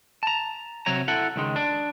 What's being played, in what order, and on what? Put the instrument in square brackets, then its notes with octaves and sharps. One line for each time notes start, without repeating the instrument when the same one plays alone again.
[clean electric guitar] A5 A#5
C3 F#3 C#5 A#5
E4 A4 F#5
C#2 D#3 G#3
D4